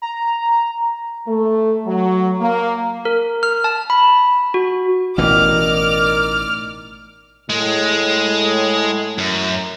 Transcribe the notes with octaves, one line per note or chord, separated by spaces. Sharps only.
A#5
A3
F#3
A#3
A#4
F6
A5
B5
F#4
A1 B2 E3 D#4 A#4 D5 D6 F6
A2 G#3
F#2